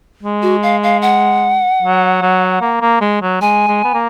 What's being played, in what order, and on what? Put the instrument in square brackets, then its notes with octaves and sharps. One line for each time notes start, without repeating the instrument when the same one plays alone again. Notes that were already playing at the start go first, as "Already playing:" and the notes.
[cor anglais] G#3
[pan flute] F#4
F5
F5
F#5
[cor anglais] F#3
F#3
A#3
A#3
G#3
F#3
[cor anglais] G#3 [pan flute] G#5
[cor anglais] G#3
B3
A#3